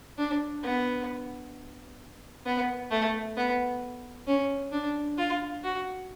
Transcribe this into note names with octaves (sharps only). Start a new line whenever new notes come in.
D4
B3
B3
A3
B3
C#4
D4
F4
F#4